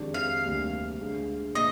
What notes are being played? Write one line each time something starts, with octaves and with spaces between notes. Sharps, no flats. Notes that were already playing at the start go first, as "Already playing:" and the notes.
Already playing: F2 D#3 G#3 D4 G4
F5
D2 C3 G3 A#3 D4
D2 D3 G#3
A#2 F3 D#5